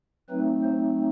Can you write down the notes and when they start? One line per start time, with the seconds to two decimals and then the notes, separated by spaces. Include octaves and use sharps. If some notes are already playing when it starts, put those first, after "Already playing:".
0.29 F#3 A3 C4 D#4 B4
0.63 C5